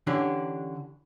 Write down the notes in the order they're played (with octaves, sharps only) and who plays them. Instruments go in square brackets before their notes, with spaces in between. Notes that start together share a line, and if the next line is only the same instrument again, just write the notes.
[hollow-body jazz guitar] D3 E3 C#4 D4 G4